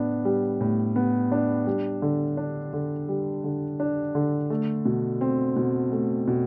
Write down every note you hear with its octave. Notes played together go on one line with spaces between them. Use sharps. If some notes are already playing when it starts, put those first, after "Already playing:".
Already playing: A2 B3 D4
G3
A2
B3
D4
G3
D3
D4
D3
G3
D3
D4
D3
A3
B2
C4
B2
A3
B2